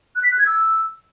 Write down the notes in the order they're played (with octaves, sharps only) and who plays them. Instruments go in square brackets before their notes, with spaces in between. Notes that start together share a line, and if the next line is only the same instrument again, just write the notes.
[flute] F#6
B6
F#6
G#6
E6